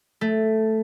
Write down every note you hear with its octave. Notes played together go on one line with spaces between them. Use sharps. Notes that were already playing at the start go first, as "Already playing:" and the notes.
A3